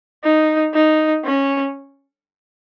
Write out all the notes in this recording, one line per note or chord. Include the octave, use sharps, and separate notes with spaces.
D#4
D#4
C#4